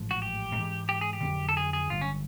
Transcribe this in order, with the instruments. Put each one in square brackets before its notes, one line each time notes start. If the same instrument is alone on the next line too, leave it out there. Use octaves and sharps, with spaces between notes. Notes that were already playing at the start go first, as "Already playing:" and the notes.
Already playing: [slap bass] A1 G#2 F3
[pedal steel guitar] F#4
G4
[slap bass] G#2 E3 G#3
[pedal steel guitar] G4
G#4
G4
[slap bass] F2 D3 F#3 A#3
[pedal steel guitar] A4
G#4
G#4
[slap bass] G1 G2 D3 F#3 [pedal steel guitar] F4
[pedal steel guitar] C#4